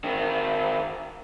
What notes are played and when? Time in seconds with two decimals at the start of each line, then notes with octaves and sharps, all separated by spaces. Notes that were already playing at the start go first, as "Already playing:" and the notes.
0.04 D#3 C4